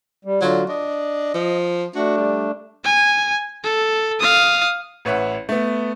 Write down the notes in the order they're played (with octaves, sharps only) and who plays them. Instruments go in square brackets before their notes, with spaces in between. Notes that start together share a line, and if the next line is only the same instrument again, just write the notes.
[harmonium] G3
[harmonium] D3 F4 F#4 [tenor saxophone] F#3
[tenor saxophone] D4 [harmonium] D#5
[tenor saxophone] F3
[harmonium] A3 D4 [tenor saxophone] F#4
[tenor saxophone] G3
[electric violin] G#5
A4
F5 D#6
[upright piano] A1 B4 C#5 E5 F#5
A3 B3